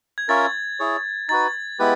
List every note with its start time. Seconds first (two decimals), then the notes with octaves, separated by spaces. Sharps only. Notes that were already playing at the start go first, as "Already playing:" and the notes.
0.18 G#6
0.28 C#4 F4 A#4 C#5 E5 A6
0.80 E4 G#4 C#5
1.29 D#4 F#4 B4 A6
1.79 G#3 B3 E4 G4 B4